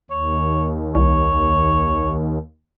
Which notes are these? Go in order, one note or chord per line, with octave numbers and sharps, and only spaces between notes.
D#2 C#5
C2 C#5